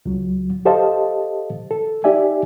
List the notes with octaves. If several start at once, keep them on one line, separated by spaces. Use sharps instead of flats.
C#2 F#3
G4 A4 C5 D#5 F5 A5
A4
D#4 G4 D5 E5 G#5